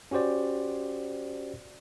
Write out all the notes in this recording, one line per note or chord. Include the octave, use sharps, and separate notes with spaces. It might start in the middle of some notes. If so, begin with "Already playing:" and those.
C#4 F#4 G4 C5 D5